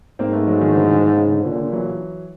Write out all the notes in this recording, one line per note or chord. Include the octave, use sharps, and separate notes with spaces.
G#2 A#3 C4
A3 B3
F#3 G#3
D#3 F3
D3 E3
D3 E3
C#3
D3
A#2 D3
D3
E3 F#3